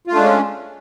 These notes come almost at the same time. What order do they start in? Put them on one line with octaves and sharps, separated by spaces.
F4 A3 D4 G#3 C#4